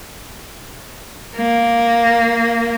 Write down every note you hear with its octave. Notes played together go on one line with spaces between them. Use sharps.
A#3